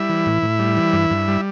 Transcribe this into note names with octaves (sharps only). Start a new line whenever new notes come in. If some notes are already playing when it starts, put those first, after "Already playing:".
Already playing: G3 E4 E5
E3
A2
A2
G3
E3
G2
G2
G3